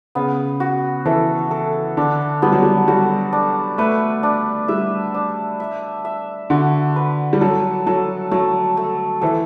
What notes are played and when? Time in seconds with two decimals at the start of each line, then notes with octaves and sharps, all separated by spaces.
0.15 C#3 B3
0.60 F#4
1.05 E3 A4
1.51 A4
1.97 D3 D4
2.42 G3 B3
2.52 F#3
2.63 G3
2.88 G3 F#4
3.33 D4
3.78 A3 B4
4.23 D4
4.68 G3 E5
5.14 D4
5.60 E5
6.05 E5
6.50 D3 F#4
6.96 B4
7.33 G3
7.41 F#3 A4
7.87 F#3 A4
8.31 F#3 A3
8.77 A3
9.21 E3 A4